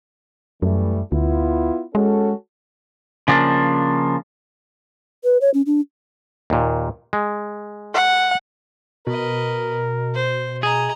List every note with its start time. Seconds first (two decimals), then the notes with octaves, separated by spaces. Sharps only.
0.62 F#2 E3 G3 A3
1.12 D2 B3 E4 F4
1.95 G#3 C#4 F#4 A4
3.28 C#3 F3 A#3 D4
5.24 B4
5.41 C#5
5.54 C#4
5.66 D4
6.50 D#2 A#2
7.13 G#3
7.94 F#5
9.07 B2 A#4 B4 D#5
10.15 C5
10.63 G#4 D#5 A#5